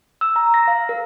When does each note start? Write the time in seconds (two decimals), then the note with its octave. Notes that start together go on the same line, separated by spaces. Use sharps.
0.21 E6
0.36 A#5
0.54 A#6
0.68 F5
0.89 A#4